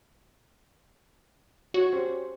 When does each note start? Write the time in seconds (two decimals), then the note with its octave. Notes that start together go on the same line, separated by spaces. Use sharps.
1.74 F#4 C#5
1.93 C#4 G4 C5